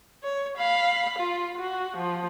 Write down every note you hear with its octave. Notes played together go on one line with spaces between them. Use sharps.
C#5
F5 B5
F4
F#4
F3